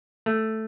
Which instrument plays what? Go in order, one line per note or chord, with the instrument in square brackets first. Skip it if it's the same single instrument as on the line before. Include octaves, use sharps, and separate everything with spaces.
[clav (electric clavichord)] A3